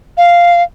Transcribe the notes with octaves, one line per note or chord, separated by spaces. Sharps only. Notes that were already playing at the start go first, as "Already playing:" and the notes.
F5